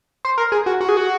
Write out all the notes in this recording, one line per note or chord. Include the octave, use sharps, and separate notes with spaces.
C5
A#4
G#4
F#4
F#4
G#4
F#4